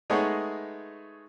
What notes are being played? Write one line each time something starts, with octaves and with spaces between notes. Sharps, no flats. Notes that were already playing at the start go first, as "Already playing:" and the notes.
G#3 A3 B3 D#4 G#4 C#5